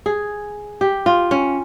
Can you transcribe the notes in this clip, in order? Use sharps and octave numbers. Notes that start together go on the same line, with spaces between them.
G#4
G4
F4
C#4